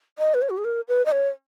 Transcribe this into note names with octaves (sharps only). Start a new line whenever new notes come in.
D#5
B4
C#5
F#4
G#4
A#4
B4
D#5
C#5